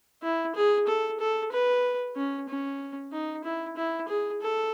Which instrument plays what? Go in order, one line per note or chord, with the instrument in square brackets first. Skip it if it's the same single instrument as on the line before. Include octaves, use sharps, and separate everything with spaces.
[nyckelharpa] E4
G#4
A4
A4
B4
C#4
C#4
D#4
E4
E4
G#4
A4